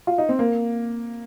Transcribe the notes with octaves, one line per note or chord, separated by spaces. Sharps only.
F4
D#4
C4
A#3